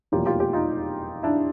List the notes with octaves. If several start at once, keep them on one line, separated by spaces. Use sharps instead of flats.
F1 E2 B2 F#3 A#3 F4 G4
F4 G4
F4 G4
D#4 F4
D4 E4